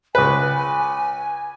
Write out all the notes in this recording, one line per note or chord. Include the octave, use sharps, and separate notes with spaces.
C#2 B4 G#5